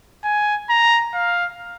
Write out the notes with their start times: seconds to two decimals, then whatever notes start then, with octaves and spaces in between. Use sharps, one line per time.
0.24 G#5
0.70 A#5
1.14 F5